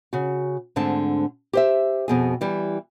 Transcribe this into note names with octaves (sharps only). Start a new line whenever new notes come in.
C#3 F#4
D2 G#2 D3 C4 A5
G4 C5 E5
F2 B2 G#4
E3 G3